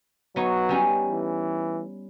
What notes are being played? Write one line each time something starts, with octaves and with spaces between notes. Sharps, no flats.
F#3 B3 D#4 C#5
G3 C#4 D#4
E3